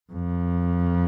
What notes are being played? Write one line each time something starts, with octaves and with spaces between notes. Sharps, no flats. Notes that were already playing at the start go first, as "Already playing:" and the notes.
F2